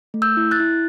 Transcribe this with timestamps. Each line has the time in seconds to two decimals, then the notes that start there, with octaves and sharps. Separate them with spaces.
0.14 A3
0.22 E6 G6
0.37 E4
0.51 F#6 A6
0.60 E4